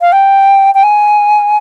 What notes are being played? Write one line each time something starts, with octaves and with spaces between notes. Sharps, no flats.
F5
G5
G5
G#5